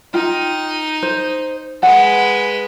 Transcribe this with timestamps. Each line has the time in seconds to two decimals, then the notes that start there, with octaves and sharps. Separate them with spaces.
0.14 D#4 F4 G5
1.03 C5
1.83 G#3 B4 F#5